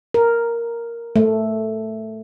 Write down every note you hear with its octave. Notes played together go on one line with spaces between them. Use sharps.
A#4
A3